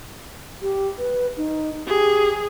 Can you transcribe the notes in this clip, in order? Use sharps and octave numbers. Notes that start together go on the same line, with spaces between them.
G4
B4
D#4
G4 G#4